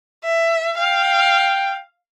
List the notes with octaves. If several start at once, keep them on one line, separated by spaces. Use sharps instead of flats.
E5
F5 G5